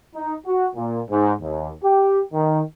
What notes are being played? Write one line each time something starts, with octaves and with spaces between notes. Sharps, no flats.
D#4
F#4
A#2
G#2
D#2
G4
D#3